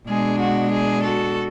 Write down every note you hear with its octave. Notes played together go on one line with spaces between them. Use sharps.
B2 G#3 D4 G#4
F#4
G#4
F#4 A4